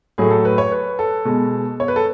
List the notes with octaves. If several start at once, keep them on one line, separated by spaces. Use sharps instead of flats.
A2 F#3 A3 G#4
A4
B4
C#5
B4
A4
B2 G#3
C#5
B4
A4